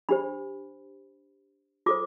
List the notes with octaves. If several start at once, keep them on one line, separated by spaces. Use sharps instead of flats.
D4 G4 C5 B5
F4 A4 C5 D6